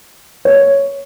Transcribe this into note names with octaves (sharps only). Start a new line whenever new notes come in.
C#5